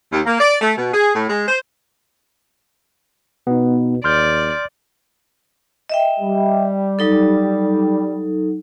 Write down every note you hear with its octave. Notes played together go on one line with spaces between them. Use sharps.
D#2
A#3
D5
A3
B2
G#4
A2
G#3
C5
B2 B3 D#4
D#2 D5 C6 F6 G6
D#5 E5 G5
G3
F#3 D#4 A4